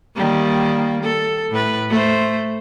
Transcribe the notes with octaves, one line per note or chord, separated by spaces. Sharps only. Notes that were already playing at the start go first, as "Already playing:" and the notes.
D#3 G3 A#3
A4
A2 B4
A3 C5